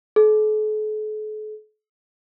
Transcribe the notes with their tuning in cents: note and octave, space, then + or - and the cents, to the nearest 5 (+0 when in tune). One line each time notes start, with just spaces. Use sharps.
A4 -45